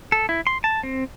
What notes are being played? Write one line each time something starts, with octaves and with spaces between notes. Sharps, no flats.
A4
E4
C6
A5
C4